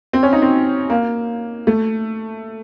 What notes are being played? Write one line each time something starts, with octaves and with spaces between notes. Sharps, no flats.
C4
C#4
D#4
C4
A#3
A3